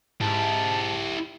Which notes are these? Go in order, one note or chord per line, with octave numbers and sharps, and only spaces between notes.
G#2 E4 G4 A5